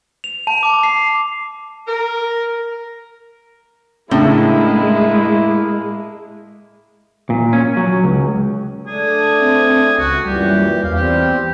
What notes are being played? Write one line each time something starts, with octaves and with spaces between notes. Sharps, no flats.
F7
A5
D6
C7
A#4
A2 C#3 G#3 A#3 D4 E4
A#2
C#4
F#3
C#2
A3 D4 G#4
C4
C#2 F#4
F#2 A#2 E3 G3 G4
E2 F5
G3 C4 G4